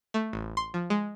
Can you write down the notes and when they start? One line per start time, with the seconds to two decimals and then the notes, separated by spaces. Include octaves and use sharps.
0.14 A3
0.33 A1
0.57 C6
0.74 F3
0.90 G#3